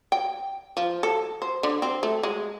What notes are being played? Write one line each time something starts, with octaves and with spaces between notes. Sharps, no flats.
G5
F3
A4
C5
D3
C4
A3
G#3